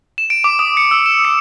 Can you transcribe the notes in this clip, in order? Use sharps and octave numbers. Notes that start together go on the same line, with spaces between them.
E7
D7
D6
D#6
C#7
E6
E7
C#7